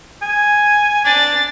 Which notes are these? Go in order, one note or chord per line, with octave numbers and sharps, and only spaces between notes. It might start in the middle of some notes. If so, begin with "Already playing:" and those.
G#5
D4 A6